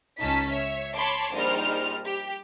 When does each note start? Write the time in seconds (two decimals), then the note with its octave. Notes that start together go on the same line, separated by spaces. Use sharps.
0.21 C#2 C#4 D#4 A5 B6
0.52 C#5 E5
0.95 C#5 A5 B5 C6 D6
1.34 A#1 G3 D#4 C5 F6
2.06 G4